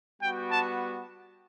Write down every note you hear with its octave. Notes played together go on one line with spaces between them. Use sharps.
G3 B3 F#4 G5
A5